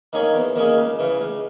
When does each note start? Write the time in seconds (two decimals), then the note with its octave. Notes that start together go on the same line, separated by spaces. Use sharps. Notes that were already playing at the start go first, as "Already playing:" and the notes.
0.13 D#3 A#3 C#4 G#4
0.34 E2
0.56 D#3 A#3 C#4 G#4
0.77 C#2
0.99 C#3 E3
1.20 C#2